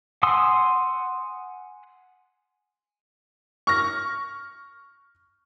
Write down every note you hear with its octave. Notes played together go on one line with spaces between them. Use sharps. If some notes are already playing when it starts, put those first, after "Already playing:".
F#5 G#5 C6 D#6 E6
C#6 F6 A#6